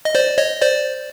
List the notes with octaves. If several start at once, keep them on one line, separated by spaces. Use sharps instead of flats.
D#5
C5 D5
C#5 D#5
C5 D5